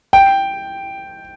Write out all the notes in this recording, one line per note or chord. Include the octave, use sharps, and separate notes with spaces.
G5